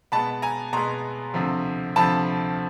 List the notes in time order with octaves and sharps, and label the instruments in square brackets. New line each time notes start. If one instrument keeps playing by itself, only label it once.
[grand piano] B2 G#3 B3 A5 B5
G#5 A#5
B2 G#3 B3 A#5 C6
D2 C3 F3
D2 C3 F3 A5 B5